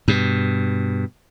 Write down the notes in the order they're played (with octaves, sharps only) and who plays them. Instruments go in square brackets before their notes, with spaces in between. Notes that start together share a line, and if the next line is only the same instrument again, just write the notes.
[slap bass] G2 B2